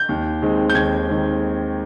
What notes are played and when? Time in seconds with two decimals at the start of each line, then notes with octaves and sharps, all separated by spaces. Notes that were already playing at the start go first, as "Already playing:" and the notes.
Already playing: G6
0.09 D#2
0.42 D#3 G#3 C4
0.70 G6
0.75 D#2 G#6
1.08 D#3 G#3 C4